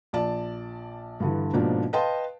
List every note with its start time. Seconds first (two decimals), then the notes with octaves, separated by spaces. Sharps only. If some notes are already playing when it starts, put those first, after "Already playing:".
0.13 A#1 D5 A5
1.20 G2 D3 E3
1.53 G#2 B2 F3 A#3 D4
1.93 B4 D#5 F5 G5 A5 C6